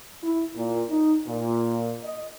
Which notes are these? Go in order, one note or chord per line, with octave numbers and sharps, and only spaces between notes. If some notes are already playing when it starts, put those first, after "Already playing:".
E4
A#2
D#4
A#2
D#5